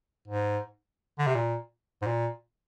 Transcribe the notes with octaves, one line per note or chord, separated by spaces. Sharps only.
G#2
D3
C3
A#2
G#2
A#2